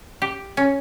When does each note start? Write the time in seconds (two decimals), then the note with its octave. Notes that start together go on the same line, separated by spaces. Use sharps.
0.22 G4
0.57 C#4